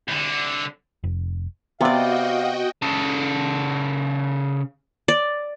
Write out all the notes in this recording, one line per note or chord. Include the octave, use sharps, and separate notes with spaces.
C2 D3
F1
C3 B3 F#4 D5 D#5 F5 G5
C#3 A4
D5